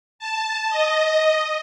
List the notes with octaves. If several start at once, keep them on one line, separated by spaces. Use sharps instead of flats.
A5
D#5